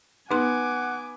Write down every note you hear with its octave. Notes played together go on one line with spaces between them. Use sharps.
B3 D#4 F#5 G#5 C6 D6